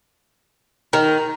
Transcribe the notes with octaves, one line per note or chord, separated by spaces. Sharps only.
D#3